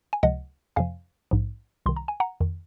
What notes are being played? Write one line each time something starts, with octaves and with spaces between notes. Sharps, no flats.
G#5
C#2 C3 F3 D#5 F#5
F2 C3 F3 F5 G#5
A#1 G#2 F3
C2 C3 D#3 C6
A#5
G#5
F#5 A#5
F2 D#3